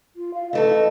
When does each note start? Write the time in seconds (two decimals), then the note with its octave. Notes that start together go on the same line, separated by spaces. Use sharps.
0.16 F4
0.34 F5
0.53 E3 A3 A4 D#5